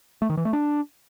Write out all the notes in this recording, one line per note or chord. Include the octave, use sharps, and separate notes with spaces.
A3
D#3
E3
A3
D4